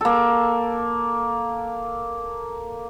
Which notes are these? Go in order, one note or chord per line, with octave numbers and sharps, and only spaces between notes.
A#3 A4